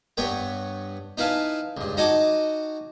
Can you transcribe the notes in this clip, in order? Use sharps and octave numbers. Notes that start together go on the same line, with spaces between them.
G2 B3 B4 C#5 G5
D#4 E4 B4 F5 G#5 A5
C#2 G2
D#4 F#4 D#5 G#5 A5 D6